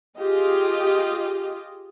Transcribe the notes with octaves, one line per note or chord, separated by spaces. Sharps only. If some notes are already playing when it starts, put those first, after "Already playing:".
F4 G4 G#4 D#5